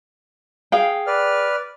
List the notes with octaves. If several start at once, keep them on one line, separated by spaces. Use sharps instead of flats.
G#4 F5 G5
B4 D5 F6